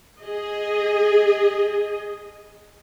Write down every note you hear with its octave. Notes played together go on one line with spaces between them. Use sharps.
G#4 D#5